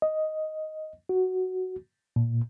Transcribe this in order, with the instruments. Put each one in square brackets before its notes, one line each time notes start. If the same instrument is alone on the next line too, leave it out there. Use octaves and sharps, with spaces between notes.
[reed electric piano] D#5
F#4
A#2